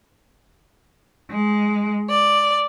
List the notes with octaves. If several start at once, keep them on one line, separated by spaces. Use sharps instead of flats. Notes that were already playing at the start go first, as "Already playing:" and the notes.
G#3
D5